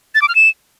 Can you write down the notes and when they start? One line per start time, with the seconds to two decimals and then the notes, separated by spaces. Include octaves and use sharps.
0.15 A6
0.22 D6
0.29 F6
0.35 E7